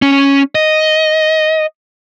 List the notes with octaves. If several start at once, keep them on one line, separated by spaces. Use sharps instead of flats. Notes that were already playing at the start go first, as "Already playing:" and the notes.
C#4
D#5